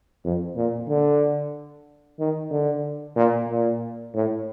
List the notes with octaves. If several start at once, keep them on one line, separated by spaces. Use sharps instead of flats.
F2
A#2
D3
D#3
D3
A#2
A#2
A2